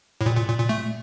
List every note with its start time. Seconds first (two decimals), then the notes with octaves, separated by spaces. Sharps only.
0.21 A2
0.26 A#2
0.36 A#2
0.49 A#2
0.59 A#2
0.69 A3